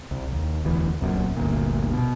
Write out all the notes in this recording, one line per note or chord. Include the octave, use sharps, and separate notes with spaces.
C2
D#2
E1 D2 E3
D1 C2 F#2 A#2
G1 D2 A#2
B2